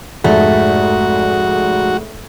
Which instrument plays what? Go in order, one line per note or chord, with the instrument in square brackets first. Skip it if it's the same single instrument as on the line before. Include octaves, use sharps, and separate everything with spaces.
[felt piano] F1 G#2 [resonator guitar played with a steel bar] A3 [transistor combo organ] F#4